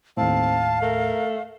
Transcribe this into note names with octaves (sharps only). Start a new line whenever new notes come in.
D#2 A2 C4 F5 A5
A3 A#4